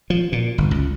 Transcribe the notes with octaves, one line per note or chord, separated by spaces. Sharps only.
F3
A#2
G1
C#2